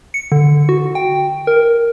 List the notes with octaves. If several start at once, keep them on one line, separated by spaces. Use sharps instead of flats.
C#7
D3
F#4
G5
A#4